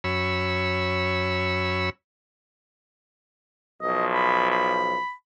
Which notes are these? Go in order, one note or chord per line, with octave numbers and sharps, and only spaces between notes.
F#2 C#5 B5 E6
B1 F3 D#5
B5
B5